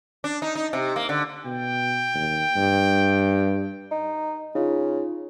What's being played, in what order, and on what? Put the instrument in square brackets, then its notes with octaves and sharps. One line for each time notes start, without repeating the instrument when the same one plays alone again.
[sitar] D4
D#4
D#4
C3
A#3
D3
[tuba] B2 [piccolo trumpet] G5
[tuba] D#2
G2
[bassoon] D#4
[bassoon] C#3 [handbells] D#4 F4